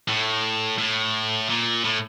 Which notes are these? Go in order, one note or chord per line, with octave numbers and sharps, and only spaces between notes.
A2
A2
A#2
A2